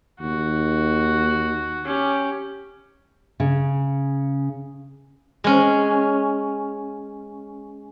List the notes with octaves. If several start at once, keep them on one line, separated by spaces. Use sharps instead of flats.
D#2 F#4
C#4 G4
C#3
G#3 C#4